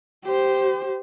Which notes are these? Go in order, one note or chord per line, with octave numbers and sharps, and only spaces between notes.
G4 C5